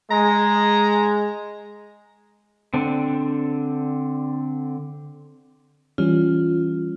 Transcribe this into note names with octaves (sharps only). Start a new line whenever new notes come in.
G#3 A#5
D3 C4 D4
E3 G3 C#4 F4